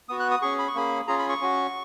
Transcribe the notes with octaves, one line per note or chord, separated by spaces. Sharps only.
B3 F#4 D#6
F#6
D#6
C#4 G#4 C#6
B5
C#6
A#3 C#4 G#4 B5
C#4 F4 G#4 A#5
B5
C#6
C#4 F#4